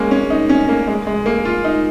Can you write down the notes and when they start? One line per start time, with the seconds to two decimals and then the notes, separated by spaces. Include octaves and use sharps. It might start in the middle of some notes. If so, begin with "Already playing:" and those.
Already playing: G#3 A#3 C#4
0.11 C#4
0.30 D#4
0.49 C#4
0.69 A#3
0.88 G#3
1.07 G#3
1.26 A#3
1.45 F4
1.64 D#4